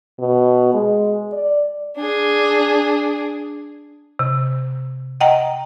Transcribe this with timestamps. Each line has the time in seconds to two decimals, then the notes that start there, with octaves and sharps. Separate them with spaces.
0.19 B2
0.74 G#3
1.33 D5
1.97 D4 G#4
4.19 C3
5.21 D#5 F#5 G5 A#5